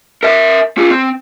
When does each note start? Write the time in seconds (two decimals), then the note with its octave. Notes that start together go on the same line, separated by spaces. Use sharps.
0.23 A#4 E5
0.78 F4 G#4
0.91 C4